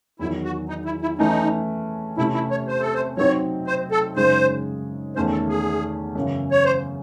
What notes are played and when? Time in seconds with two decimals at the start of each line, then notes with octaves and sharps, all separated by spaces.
0.19 E2 D#3 F#3 E4
0.44 F#4
0.69 D#4
0.85 E4
1.02 E4
1.19 E3 A3 C#4 D#4
2.18 C3 E3 A3 C#4 E4
2.34 E4
2.51 C#5
2.68 C5
2.81 A4
2.94 C5
3.17 F#3 C4 D#4 C#5
3.67 C5
3.91 A4
4.16 F#2 C#3 G#3 D#4 G#4 C5
5.16 E2 D#3 A3 C#4 C5
5.33 A4
5.49 G#4
6.15 F#2 C#3 E3
6.51 C#5
6.64 C5